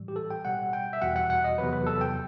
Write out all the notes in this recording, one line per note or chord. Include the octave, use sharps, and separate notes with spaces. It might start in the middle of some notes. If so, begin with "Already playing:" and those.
Already playing: A2 E3 G3
G4
A4
G5
B2 G3 F#5
G5
E5
E2 B2 G3 F#5
F#5
F#5
D#5
E2 C3 F#3 B4
B4
A4
G5